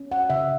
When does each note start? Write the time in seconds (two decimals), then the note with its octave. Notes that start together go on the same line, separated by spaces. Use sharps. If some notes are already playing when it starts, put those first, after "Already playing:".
Already playing: C#4
0.12 F#5
0.30 C#3 E5